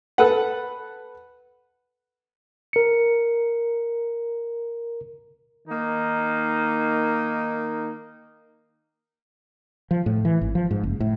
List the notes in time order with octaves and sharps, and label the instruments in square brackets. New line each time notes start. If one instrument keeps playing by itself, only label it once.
[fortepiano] A4 B4 F#5
[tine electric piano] A#4 C#7
[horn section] D#3 A#3 D#4
[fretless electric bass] F3
A2
E3
G#1
F3
G#2
F#1
A2